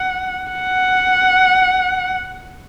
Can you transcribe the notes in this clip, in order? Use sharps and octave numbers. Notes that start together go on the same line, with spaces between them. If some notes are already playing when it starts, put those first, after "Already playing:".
Already playing: F#5
F#5